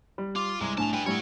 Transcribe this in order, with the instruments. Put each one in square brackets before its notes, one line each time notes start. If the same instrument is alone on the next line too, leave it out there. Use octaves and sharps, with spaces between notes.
[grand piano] G3
[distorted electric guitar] F4 [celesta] D6
[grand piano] C2 [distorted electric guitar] G#3
[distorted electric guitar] F2 A5 [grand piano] A2 [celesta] D4 G#5 F7
[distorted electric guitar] G3 B4 [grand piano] G5
[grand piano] A2 G3 [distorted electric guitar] F#3 C#5